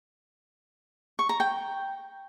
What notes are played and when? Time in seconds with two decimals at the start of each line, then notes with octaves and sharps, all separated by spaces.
1.19 C#6
1.29 A#5
1.40 G5